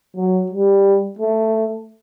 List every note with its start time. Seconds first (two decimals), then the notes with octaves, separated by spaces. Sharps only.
0.17 F#3
0.52 G3
1.19 A3